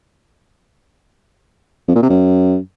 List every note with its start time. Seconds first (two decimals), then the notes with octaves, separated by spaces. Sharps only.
1.88 F2
1.95 A#2
2.02 C3
2.09 F#2